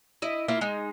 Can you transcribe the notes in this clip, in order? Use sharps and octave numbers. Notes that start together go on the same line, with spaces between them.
E4 D#5
A#3 E4 F4
G#3 D#4